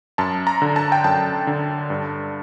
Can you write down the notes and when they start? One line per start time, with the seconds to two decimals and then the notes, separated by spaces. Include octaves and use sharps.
0.18 F#2 A5
0.47 A#5
0.62 D3
0.76 A5
0.92 G5
1.04 F#2 A5
1.47 D3
1.90 G2